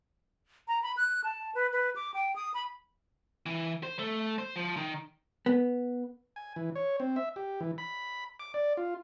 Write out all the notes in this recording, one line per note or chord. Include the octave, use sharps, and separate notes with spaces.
A#5
B5
F#6
A5
B4
B4
D6
G5
D#6
B5
E3
C5
A3
C5
F3
D#3
B3
G#5
E3
C#5
C4
E5
G4
E3
B5
D6
D5
F4